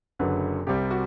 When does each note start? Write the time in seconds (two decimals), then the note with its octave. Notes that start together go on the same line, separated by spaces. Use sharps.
0.19 F#1 F#2 D3 F#3 B4
0.67 C2 C3 G3 G4
0.91 F#4